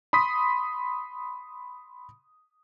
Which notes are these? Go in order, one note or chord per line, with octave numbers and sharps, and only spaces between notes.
B5 C6 D#6 B6